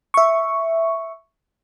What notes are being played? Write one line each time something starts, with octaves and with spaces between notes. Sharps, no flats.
E5 C#6